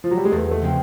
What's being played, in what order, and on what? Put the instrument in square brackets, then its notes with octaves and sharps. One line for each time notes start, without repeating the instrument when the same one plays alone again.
[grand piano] F3
F#3
G3
G#3
[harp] E2 [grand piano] A3
[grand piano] A3
[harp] C#3 F3 G#3 C4